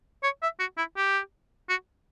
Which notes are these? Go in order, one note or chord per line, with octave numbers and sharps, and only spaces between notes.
C#5
E5
F#4
E4
G4
F#4